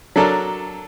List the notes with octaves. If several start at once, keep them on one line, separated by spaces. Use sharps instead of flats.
F#3 D4 A4 A#4